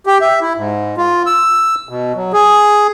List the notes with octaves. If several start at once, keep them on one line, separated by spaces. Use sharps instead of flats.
G4
E5
E4
G#2
F4
E6
B2
F#3
G#4